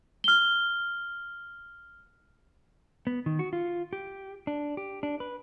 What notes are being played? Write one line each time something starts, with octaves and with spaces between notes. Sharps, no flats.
F6 G7
B3
D#3
F#4
F4
G4
D4
G4
D4
B4